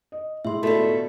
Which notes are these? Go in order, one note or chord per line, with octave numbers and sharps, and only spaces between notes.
D#5
A2 G#3 E5 C6
B2 D3 A3 F4